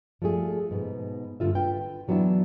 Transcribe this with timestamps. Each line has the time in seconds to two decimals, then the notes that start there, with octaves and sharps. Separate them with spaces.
0.22 F3 G3 A3 G#4
0.71 G#2 B2 B3
1.40 G2 D3 F4 E5
1.55 F4 B4 G5
2.08 E3 F#3 B3 D4 E4